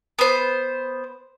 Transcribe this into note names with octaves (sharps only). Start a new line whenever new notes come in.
B3 C5